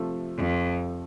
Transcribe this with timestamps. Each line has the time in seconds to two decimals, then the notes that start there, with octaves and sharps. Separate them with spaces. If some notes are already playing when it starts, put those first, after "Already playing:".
Already playing: C3 F3 A3
0.37 F2